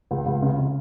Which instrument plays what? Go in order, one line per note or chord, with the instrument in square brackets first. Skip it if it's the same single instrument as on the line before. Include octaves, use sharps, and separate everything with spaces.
[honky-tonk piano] C#2
C#2
C#3
C#3